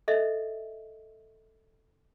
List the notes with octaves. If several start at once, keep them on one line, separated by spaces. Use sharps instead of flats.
A4 D#5 E5